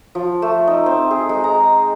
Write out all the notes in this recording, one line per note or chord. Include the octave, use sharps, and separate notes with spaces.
F3
A3
D#4
C4
G#4
G#3
A#5